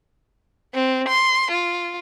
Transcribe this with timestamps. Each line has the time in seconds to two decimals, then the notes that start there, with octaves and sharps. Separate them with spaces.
0.74 C4
1.09 C6
1.51 F4